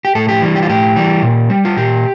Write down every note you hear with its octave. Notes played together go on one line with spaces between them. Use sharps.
G4
A2 A4
G4
E3 G3
G4
F4
A2 G4
E3 G3
A#2
G3
F4
A#2 G4